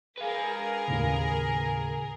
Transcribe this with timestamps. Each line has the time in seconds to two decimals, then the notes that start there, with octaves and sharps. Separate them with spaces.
0.17 G#4 A#4 B4 F5
0.88 D#2 A2 C#3